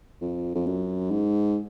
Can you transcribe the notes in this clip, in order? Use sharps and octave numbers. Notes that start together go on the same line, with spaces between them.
F2
F2
F#2
G#2